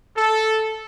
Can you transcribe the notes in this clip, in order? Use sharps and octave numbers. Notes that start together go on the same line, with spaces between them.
A4